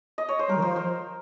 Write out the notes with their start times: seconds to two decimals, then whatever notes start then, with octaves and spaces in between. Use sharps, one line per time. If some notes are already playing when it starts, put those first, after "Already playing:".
0.18 D#5
0.29 C#5
0.39 C5
0.49 G3 A#4
0.57 D#3
0.62 F3 C5
0.76 C5